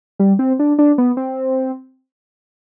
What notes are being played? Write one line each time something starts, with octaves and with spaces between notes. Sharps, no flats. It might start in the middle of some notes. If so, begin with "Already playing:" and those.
G3
C4
D4
D4
B3
C4